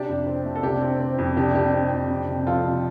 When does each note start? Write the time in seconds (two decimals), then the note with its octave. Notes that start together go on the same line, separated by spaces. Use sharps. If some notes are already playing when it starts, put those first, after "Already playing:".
Already playing: C3 D4 G4
0.09 F2
0.26 C4
0.45 A3
0.55 A4
0.63 C3 D4 G4
0.82 C4
1.00 C4
1.18 F2
1.37 C3 D4 G4
1.54 C3 D4 G4
1.74 C4
1.91 F2
2.10 F2
2.28 C3
2.46 F3 F4 A4
2.65 C3